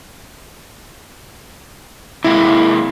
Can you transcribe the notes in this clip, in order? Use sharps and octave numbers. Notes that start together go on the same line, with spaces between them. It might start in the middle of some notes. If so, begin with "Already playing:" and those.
C3 G#3 A#3 E4